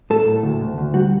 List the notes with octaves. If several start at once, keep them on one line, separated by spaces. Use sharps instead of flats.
A2 A4
A2
D2
D2
D2
G3 F#4